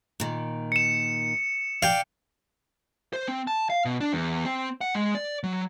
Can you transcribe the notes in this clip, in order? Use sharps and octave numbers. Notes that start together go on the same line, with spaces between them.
A#2 D#3
C#7 E7
D5 F5 G5
C5
C4
A5
F5
B2
D4
E2
C4
F#5
G#3
D5
F#3